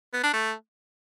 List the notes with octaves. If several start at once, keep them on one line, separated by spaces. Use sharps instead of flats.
B3
D4
A3